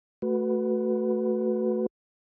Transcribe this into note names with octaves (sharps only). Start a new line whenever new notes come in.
A3 F#4 B4